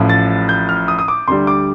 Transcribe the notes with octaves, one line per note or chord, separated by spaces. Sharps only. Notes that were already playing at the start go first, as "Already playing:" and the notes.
Already playing: A1 A2 F3
A6
G6
F6
D#6
D#6
D6
D2 D3 G3 C6
D6